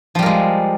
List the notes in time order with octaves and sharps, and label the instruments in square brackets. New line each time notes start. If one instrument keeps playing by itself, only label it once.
[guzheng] F3
G3
A#4
G#3